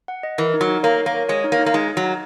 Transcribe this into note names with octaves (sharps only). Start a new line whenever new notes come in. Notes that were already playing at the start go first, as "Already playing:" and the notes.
F#5
D#5
E3 A#4
D#4
F#3
D#4
A#3 C#5
A#4
A#3
C#5
G#3 C#5
D#4
A#3
D#4
A#3
G#3 D#4
D#4
F#3
D#4